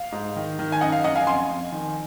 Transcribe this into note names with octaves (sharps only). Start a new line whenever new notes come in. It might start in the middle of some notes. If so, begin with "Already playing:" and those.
Already playing: F5
G#2
D#3
D#3
G#5
F#2 D#5 F#5
F5
F#2 D#5 F#5
F5 G#5
F2 G#5 C6
F2
D#3